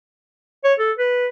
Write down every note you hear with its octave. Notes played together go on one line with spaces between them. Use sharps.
C#5
A4
B4